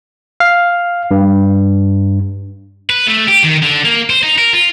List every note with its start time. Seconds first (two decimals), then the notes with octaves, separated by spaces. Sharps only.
0.40 F5
1.11 G2
2.90 B4
3.07 A3
3.28 G4
3.44 D#3
3.63 D3
3.85 A#3
4.10 C5
4.23 D#4
4.38 A#4
4.53 F4